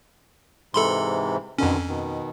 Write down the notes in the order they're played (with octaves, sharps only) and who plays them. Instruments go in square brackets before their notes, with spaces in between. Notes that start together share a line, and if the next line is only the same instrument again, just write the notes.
[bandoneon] G#2 C3 E3 [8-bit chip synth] A4 B5 C6
[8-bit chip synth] F2 C#4 [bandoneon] B2 D3 D#3
[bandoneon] B2 D#3